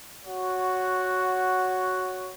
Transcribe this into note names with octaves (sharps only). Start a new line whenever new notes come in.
F#4 C#5 F#5